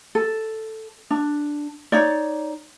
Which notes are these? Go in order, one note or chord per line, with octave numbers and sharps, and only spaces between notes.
A4
D4
D#4 C#5 D5